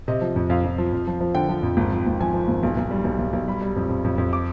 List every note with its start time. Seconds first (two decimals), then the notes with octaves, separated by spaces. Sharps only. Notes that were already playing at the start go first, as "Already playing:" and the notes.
0.08 C3 D#5
0.21 F3
0.36 F2
0.50 F2 F5
0.64 F2
0.78 F3
0.93 F2
1.07 F3
1.21 F3
1.34 D3 G5
1.49 F3
1.63 F2
1.77 G#1
1.92 F3
2.06 G#1
2.20 F3 G#5
2.34 F3
2.48 G#1
2.63 B1
2.77 B1
2.91 G3
3.05 B1
3.19 B1
3.33 B1
3.48 G3 B5
3.61 G3
3.76 F2
3.89 F2
4.04 F2
4.18 F2
4.33 D6